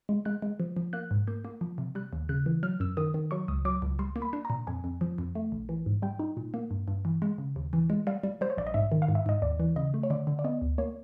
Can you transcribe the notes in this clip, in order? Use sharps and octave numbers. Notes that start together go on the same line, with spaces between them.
G#3
G#3 F#6
G#3
F3
F3
A#3 F#6
G#2
A#3 G6
A#3
F3
C3
G3 F#6
D#2
C#3 F#6
E3
F#3 F6
F#2 E6
D#3 D#6
D#3
F#3 C#6
C#2 D#6
F#3 D6
C#2
G3 C6
A#3
B5
D4
A#5
A#2
F2 G#5
F2
F3
F2
A3
A#1
E3
G#2
G3 G5
D#4
A#2
A#3
G2
G2
E3
G#3
C#3
D#2
E3
G#3
G3 F5
G3
G3 C5
C#5
A#1 D5
D#5
G#2 E5
D#3
F5
G#2
E5
G#2 D#5
D#2 D5
E3
C#3 D#5
A3
C#5
D3 D5
D3
D5
B3 D#5
D2
A#3 C#5